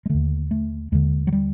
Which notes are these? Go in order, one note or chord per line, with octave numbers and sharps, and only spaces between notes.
G#3
D#2 D3 A3
A3
D#2 D3 G#3
F#3
G3